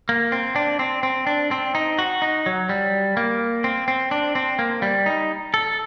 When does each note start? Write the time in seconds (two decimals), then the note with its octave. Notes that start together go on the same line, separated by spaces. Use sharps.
0.09 A#3
0.32 C4
0.56 D4
0.79 C4
1.03 C4
1.27 D4
1.51 C4
1.75 D#4
1.99 F#4
2.22 D#4
2.46 F#3
2.69 G3
3.17 A#3
3.64 C4
3.88 C4
4.11 D4
4.35 C4
4.59 A#3
4.82 G3
5.06 D#4
5.54 A4